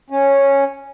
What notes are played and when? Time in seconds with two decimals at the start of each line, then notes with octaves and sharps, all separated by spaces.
0.10 C#4